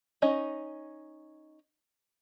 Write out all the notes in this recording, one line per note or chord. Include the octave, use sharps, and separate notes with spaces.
C#4 D#4 C#5 D#5